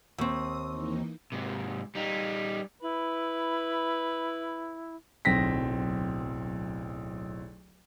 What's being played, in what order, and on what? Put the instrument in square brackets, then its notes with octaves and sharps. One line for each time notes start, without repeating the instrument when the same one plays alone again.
[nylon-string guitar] D#2 C4 [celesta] C6 C#6 E6 [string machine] D#6
[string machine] E3 A#3 D#4
[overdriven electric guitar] G#2 C3
G3 D#4
[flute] E4 [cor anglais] B4
[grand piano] D1 B1 C4 A#6 B6